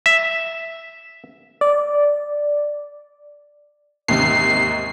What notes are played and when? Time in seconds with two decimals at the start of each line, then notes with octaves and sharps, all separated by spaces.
0.06 E5
1.61 D5
4.08 D#2 G#2 C3 C7